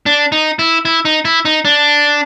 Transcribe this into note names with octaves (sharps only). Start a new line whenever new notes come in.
D4
D#4
E4
E4
D#4
E4
D#4
D4